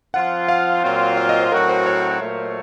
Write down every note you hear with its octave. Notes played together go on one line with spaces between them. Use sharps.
F3 C4 F4 F#5
F5
A#2 F#3 C4 F4
F5
D#5
C5
A2 F#3 C4 F#4 A#4
C5
C#5
A#2 F#3 A3